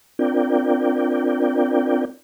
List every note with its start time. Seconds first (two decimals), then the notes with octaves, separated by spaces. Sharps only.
0.19 C4 D4 F4 A#4 D5 G5